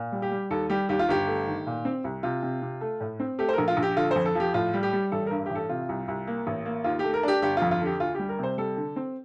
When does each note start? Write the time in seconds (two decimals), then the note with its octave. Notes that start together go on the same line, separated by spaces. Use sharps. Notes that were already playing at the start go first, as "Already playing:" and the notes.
Already playing: A#2
0.12 G3
0.22 G4
0.31 G3
0.50 D#2 A4
0.70 G3 G4
0.89 D#2 G4
0.99 F4
1.09 G1 G4
1.27 A3
1.47 D#3
1.67 A#2
1.85 C4
2.04 C2
2.23 C3 F4
2.43 C3
2.62 C3
2.81 A3
3.00 A2
3.20 C4
3.39 A3 G4
3.49 C5
3.53 A#4
3.58 A#1
3.68 F4
3.77 A#1
3.82 G4
3.96 D3 F4
4.11 F2 C5
4.25 A4
4.35 F3 G4
4.54 A2 F4
4.73 G3
4.83 G4
4.93 G3
5.12 A1 A4
5.26 G2 A#4
5.46 G4
5.50 A1 A4
5.69 C3 F4
5.89 C2
6.08 C2
6.27 A#3
6.47 A1
6.65 A#3
6.84 D#2 F4
6.99 A3 G4
7.14 A#4
7.23 D4 G4
7.42 G1 G4
7.57 F2 F4
7.71 F4
7.81 D3 G4
8.00 D2 F4
8.15 G3 G4
8.29 A#4
8.39 C3 C5
8.58 G3 A4
8.77 D3
8.96 C4